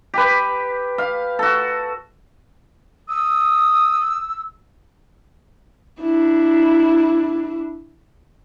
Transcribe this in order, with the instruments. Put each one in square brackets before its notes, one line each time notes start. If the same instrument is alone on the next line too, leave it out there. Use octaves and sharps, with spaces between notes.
[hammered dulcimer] G4 B4
F5
F#4 A4
[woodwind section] D#6 [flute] E6
[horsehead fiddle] D4 E4